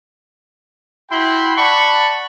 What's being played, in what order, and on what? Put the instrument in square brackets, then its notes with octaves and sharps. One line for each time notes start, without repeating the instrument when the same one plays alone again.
[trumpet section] E4 F#4 G5 B5 C6
D5 F#5 A5 B5 C#6